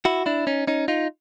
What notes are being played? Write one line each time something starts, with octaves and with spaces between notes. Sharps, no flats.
E4 F#4
D4 E4
C#4 D#4
C#4 D#4
D#4 F4